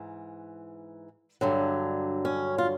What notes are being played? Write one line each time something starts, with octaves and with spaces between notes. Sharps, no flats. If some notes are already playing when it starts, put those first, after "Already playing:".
Already playing: G#2 E3
G2 D3 F#3
C#4
F4